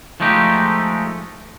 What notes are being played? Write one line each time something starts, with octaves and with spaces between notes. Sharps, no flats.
F3 G#3 A3 D#4 G4